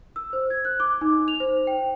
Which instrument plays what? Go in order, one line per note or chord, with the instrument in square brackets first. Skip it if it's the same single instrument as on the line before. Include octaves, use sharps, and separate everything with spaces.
[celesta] E6
C5
G#6
F#6
D6
D#4
F7
C5
G5